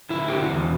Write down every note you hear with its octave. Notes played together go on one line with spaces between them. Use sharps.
D3 E4
D3 G4
F#4
E2